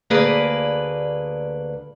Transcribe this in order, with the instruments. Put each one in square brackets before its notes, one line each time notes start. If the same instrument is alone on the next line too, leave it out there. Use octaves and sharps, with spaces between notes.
[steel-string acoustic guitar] D2 A#3 G#4 B4 D5